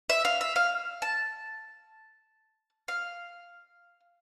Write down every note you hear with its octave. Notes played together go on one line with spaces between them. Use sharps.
E5
F5
E5
F5
A5
F5